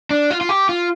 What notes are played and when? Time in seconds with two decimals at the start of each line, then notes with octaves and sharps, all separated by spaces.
0.11 D4
0.31 F4
0.41 F4
0.49 G4
0.69 F4